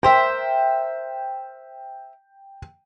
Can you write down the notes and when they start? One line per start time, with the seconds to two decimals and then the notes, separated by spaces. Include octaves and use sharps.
0.03 A#4 C5 E5 G5